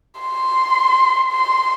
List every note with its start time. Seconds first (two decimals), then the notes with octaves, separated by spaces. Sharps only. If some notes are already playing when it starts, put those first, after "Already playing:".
0.20 C6
1.31 C6